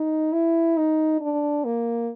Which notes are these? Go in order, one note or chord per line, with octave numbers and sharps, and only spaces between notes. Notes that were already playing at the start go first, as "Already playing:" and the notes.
Already playing: D#4
E4
D#4
D4
A#3